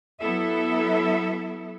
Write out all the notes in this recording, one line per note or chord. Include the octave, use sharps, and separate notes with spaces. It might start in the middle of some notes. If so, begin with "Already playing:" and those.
F#3 B3 E4 A4 E5